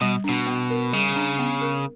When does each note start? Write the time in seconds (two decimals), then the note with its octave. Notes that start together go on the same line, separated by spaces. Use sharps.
0.01 B2 G3
0.24 B2 D4
0.47 B3
0.70 A#4
0.93 C#3 G3
1.16 D4
1.39 B3
1.61 A#4